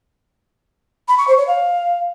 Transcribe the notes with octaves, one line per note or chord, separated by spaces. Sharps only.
B5
C#6
C5
C#5
F5